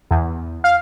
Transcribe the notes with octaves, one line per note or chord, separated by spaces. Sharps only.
E2
F5